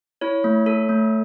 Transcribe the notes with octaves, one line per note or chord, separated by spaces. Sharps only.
E4 C#5
A3
A4
A3